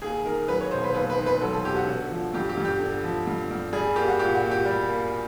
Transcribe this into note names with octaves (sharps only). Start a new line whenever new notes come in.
D#2 G#4
D#3 A#4
F#3 B4
C#5
E1 C5
B4
D#2 B4
B4
D#3
B4
F#3 A4
A4
E1 G4
F#4
D3
F3
G2 G4
G4
G2
G4
D3
F3
G2
G2
G3 G#4
A#3 G4
F#4
A#2 G4
F#4
A#2
G4
G3
A#3